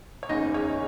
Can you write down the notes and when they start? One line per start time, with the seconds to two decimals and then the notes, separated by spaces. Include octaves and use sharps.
0.23 C#5
0.29 F#1 E2 C#3 D#4 D#5
0.54 C#4 C#5